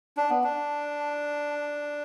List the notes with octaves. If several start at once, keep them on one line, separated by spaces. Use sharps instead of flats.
D4
B3
D4